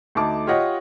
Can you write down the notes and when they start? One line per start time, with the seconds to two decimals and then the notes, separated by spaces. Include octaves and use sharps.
0.15 D2 A3 D#4 A5 D6
0.47 F4 G4 C#5 D#5 F#5